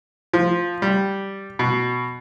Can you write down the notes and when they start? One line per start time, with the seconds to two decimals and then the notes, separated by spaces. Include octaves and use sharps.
0.33 F3
0.82 G3
1.59 B2